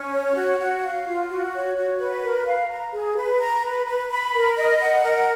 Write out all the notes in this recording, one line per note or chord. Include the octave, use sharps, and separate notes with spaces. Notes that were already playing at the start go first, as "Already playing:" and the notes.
Already playing: C#4
C#5
F#4
F#4
F5
F4
F#4
C#5
F#4
B4
A#4
F5
A#5
G#4
B4
A#5
B4
B4
B5
A#4
D#5
F#5
A#4